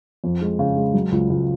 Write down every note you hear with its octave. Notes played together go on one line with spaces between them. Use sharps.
F2
G#3
C#3
G#3
F#3
C#2
C#2